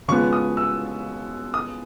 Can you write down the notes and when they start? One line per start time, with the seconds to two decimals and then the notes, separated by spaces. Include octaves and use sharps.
0.08 C#3 F3 G#3 B3 C#6
0.33 D#6
0.57 E6
1.54 D#6